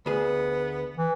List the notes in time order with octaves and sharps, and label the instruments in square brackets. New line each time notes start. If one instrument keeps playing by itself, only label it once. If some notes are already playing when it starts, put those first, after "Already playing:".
[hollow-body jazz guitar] D2 G#4 [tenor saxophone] B3
[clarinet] E3